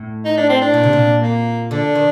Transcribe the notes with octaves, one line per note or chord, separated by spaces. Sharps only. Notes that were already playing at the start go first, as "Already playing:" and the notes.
Already playing: A2
D#4
D4
C4
D4
A#2
C3
A#2
A#3
D3 D4
D#3